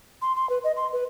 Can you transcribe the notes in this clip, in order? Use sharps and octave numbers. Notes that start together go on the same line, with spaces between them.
C6
C6
B4
D#5
C6
B4